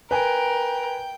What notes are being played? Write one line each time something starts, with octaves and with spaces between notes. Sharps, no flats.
A#4 B4 G5 G#5